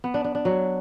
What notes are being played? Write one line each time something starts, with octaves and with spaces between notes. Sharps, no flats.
B3
D4
D4
D4
F#3